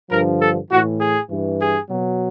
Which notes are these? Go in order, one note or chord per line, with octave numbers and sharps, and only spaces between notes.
G2 D3 F3 A#4
A4
A2 E3 F#4
G#4
G2 E3
G#4
B2 F#3